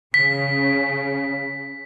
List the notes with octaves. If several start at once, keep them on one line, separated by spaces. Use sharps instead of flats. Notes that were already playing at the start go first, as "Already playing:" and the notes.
C#3 B6